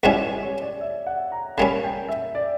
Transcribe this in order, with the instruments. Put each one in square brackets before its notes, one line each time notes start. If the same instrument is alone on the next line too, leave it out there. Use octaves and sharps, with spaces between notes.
[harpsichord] C#2 B2 G3 C#4 E4 [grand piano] G4
[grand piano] C#5
D5
E5
F#5
A#5
[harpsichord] C#3 G3 A#3 C#4 [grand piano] B5
[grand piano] G5
E5
D5